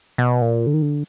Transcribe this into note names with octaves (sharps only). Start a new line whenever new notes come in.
B2
A#2
D3
D#3
D3